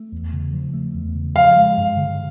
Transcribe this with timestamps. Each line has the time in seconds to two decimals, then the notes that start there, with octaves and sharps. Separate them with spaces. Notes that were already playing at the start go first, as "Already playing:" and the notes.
Already playing: A3
0.12 E2
0.33 C#3
0.53 F3
0.74 A3
0.94 E2
1.15 C#3
1.36 F3 F5
1.56 G#3
1.77 G2
1.97 D3